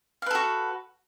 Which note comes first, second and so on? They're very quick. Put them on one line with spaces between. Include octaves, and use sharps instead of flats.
F5 B4 A4 F#4